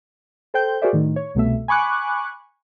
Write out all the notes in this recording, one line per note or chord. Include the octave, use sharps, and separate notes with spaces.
A4 C5 G5 G6
F#4 G#4 A#4 C5 D5 E5
A2 D#3
C#5
C2 B2 A3 E5
G#5 B5 C#6 D6 F#6